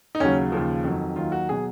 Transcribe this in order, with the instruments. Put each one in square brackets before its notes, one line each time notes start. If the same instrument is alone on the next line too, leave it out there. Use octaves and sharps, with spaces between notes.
[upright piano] D#4
D#2 C#3 F#3 C#4
D#2 C#3 F3
F2 D#3 F#3
D#2 D#3 F#3 F4
F#4
B2 F#3 G#4